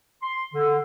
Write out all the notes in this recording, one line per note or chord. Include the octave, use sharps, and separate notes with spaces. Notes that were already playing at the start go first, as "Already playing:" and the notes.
C6
D3